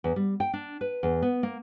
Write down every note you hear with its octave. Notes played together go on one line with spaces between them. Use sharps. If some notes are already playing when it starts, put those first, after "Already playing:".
E2
G3
G5
D4
B4
E2
B3
A#3